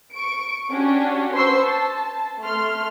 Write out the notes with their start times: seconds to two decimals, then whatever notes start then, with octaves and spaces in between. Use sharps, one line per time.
0.13 C#6 D7
0.70 C#4 D4 F#4 G4
1.34 B4 C5 C6 C#6 E6 C7
1.65 A5
2.41 A3 C6 F6